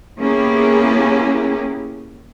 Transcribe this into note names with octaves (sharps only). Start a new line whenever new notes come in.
A#3 B3 C#4 E4 G4 G#4